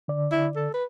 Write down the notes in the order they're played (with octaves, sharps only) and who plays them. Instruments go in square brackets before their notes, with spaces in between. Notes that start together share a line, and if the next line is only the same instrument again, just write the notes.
[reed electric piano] D3 D5
[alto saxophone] E4
A4
B4